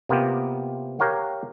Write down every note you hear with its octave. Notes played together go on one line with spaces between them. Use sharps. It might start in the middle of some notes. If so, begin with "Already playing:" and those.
C3 A#3 B3 F4 G4
G4 A#4 C#5 F5 F#5